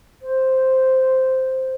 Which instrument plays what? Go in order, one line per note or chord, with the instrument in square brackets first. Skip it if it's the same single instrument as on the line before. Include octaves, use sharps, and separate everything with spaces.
[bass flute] C5